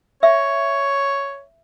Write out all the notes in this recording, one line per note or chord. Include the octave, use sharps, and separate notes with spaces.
C#5 E5